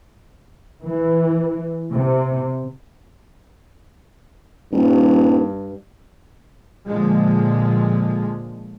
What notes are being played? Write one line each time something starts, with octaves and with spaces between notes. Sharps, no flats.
E3
C3
D#1 G2
A#2 D3 F3 G#3